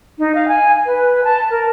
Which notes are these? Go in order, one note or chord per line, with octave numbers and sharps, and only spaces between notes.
D#4
F5
G#5
B4
A5
A#4